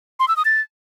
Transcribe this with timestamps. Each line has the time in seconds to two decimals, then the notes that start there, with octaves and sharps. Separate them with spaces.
0.20 C6
0.28 E6
0.37 D#6
0.45 A6